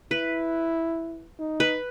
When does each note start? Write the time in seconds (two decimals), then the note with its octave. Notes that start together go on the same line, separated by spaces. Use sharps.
0.11 E4 B4
1.39 D#4
1.60 B4